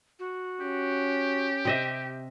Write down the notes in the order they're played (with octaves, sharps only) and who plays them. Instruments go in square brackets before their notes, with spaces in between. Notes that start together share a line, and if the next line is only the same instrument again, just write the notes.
[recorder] F#4
[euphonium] C#4 [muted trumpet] G4
[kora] C3 D#5 E5